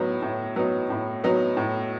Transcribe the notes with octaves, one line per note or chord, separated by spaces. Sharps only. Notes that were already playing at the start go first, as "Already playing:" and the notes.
Already playing: A2 F#3 B3 D#4
A2
F#3 B3 D#4
A2
F#3 B3 D#4
A2